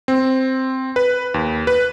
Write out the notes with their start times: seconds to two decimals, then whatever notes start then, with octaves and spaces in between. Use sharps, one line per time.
0.08 C4
0.96 B4
1.34 D#2
1.67 B4